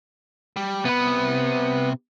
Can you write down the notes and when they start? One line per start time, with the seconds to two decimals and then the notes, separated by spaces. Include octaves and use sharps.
0.56 G3
0.85 C3 B3 B5